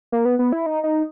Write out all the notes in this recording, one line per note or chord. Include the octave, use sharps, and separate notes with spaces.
A#3
B3
B3
E4
D#4
D#4